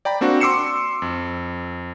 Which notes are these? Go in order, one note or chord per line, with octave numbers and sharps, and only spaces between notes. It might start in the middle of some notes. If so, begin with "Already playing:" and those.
D5 G5 A#5 B5
A#3 C4 D4 F#4
C6 D6 E6 C7 C#7 E7
F2